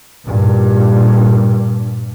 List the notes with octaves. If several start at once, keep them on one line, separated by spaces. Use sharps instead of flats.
G2 A#2